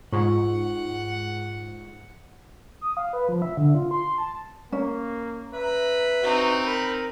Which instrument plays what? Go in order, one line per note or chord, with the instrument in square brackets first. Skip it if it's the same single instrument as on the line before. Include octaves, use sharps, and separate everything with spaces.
[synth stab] G#2 [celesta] F4 C#6 [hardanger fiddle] F#5
[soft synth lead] D#6
F5
B4
F3
E5
D3
F4
C6
A5
[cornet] A#3 [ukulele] C#4
[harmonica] B4 E5 [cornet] A#5
[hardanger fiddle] C4 D#4 [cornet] F#4
[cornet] A#4 [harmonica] B5